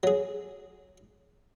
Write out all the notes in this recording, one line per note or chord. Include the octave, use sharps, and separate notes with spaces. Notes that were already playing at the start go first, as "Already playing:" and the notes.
F#3 G#4